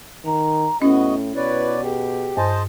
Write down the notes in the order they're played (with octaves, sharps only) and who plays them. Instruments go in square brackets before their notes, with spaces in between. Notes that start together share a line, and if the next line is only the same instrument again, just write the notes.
[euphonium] D#3 [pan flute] A#5
[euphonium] A2 [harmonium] B3 F#4 D#5 [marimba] C#4 [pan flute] E4
[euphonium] B2 [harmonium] B4 C#5 D5
[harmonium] G4 [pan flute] G#4
[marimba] G2 [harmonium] C5 D#5 A5